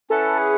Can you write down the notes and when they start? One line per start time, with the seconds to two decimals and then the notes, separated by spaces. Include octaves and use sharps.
0.10 C#4 E4 A4 B4 F#5
0.38 G#4